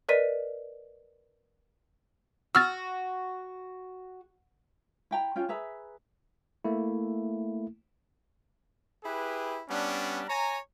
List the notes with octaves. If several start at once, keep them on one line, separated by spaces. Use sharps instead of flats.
A#4 B4 D5 D#5 B6 D#7
F#4 E6 F6 A6
E4 G5 A#5
C#4 F4 G5
G#4 B4 E5 A#5
A3 A#3 E4
E4 G4 G#4 B4
G3 B3 C#4 D4
C#5 G#5 A#5